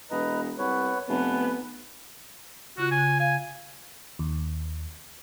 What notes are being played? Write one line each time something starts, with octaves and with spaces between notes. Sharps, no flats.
E1 B4 D#5 A#5
C2 B3 B4 C#5
F1 B3 B4
C#3 F4 F#4 F#6
C#3 G#5
F5 G#5
D#2